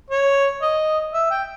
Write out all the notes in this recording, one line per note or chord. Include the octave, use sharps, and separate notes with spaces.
C#5
D#5
E5
G5